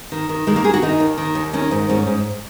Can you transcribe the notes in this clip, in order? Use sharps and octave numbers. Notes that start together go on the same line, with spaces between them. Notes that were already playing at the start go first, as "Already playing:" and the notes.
D#3
D#3
D#3 G#3
A#3
D#3 G#4
F#4
D#3 D#4
D#2
D#3
D#2
D#3 C#4
G#2
G#2 C#4
G#2